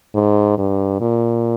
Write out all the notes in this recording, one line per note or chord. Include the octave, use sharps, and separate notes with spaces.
G#2
G2
A#2